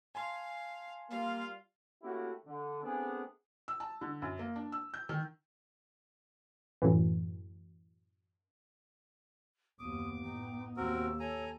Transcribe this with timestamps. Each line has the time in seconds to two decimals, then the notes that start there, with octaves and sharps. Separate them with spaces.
0.15 F5 G#5 A5 C6
1.10 G3 A#3 F4 F5
2.03 A3 A#3 C#4 E4 F#4 G4
2.46 D3
2.82 A3 B3 C4 D4 G#4
3.68 E6
3.80 A5
4.01 D3
4.22 F#2
4.39 A#3
4.56 D4
4.72 E6
4.94 G6
5.09 D#3
6.82 F#2 A2 E3
9.79 F#1 D#2 B3 D6 D#6
10.24 A2 D#4 G5
10.77 D#2 C4 F#4 A#4 E6
11.20 A4 C#5 G#5 A#5